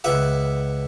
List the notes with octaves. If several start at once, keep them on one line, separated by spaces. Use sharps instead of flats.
C#2 B4 E5 F#5